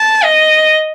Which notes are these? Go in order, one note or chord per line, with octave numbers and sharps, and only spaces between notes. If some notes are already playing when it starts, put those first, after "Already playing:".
Already playing: A5
D#5